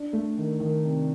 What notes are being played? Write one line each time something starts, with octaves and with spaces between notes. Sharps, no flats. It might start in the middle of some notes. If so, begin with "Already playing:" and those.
Already playing: D4
A3
D#3
D#3
C3